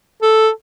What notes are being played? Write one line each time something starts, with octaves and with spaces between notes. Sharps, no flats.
A4